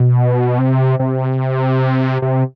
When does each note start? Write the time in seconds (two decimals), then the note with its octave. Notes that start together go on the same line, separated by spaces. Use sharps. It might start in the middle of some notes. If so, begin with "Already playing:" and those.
Already playing: B2
0.59 C3
0.99 C3
2.22 C3